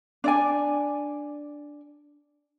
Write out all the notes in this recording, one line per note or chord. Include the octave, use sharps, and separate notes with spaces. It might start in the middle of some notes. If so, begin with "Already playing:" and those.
D4 D5 G#5